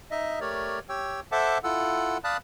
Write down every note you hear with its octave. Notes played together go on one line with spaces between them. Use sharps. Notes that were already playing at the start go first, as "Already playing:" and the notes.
D#4 D#5 E5
A3 G4 A#4 C#5 D5
G4 C#5 G5 E6
A4 C5 E5 F#5 A5 D6
E4 F4 A4 F#5 E6
D5 F5 A5 B5 D#6 F#6